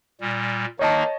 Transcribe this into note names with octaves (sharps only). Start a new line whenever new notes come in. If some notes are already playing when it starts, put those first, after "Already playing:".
A#2 G3
D#3 A#3 D#4 C#5 D#5 A5